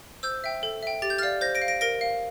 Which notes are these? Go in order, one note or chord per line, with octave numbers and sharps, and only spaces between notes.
C5 E6 G6
E5 G5
A4
E5 G5
G4 A6
G6
D5 F5 F6 A6
C5 G6 A#6
A#6 D7
F5
A#6 D7
A#4 A#6 D7
F5